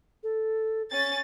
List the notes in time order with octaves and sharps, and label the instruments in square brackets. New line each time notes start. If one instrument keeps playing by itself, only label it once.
[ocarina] A4
[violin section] C#4 A6